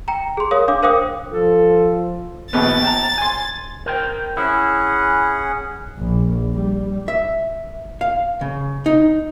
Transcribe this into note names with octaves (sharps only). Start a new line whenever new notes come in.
G5 A#5
G#4 C6
A#4 C#5 F5 D#6
D4 F5 D6
A#4 C5 F5 G5 D6 D#6
F3 A4
A#1 D#2 B3 A6
G5 A5 A#5
G#5 C6
A#4 C5 G5
C#4 E4 G#4 F#5
A#1
G3
E5
F5
C#3
D#4